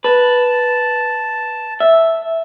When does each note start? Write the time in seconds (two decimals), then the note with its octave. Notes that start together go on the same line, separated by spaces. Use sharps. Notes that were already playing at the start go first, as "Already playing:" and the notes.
0.04 B4 A5
1.80 E5